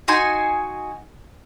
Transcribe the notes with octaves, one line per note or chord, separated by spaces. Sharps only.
D#4 F#4 G#5 C6